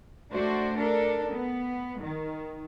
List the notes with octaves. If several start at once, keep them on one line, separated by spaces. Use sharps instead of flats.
A3 D4 F#4 C5 D5
D4 A4 A#4
B3
D#3